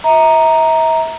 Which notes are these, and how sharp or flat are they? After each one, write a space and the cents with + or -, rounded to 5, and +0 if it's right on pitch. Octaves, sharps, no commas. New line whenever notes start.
E5 -40 A#5 +0